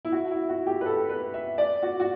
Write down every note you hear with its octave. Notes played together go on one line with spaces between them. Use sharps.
E4
F#4
E4
F#4
G4
B4
A4
B4
E5
D5
F#4
F#4